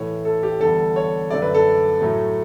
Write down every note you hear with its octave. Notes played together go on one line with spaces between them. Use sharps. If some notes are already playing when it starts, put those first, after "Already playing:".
Already playing: A2 E3 A3 C#5
A4
G4
E2 D3 G3 A4
C#5
F#2 D3 A3 D5
B4
A4
A2 F#3 A3